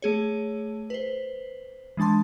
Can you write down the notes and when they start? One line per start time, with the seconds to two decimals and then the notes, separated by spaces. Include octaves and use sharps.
0.02 A3 G#4 C#5
0.90 B4 C5
1.97 E3 G#3 D4 A5 C6